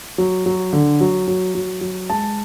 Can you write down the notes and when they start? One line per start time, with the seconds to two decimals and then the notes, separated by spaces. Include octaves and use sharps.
0.18 F#3
0.46 F#3
0.73 D3
1.01 F#3
1.28 F#3
1.55 F#3
1.81 F#3
2.09 G#3 A5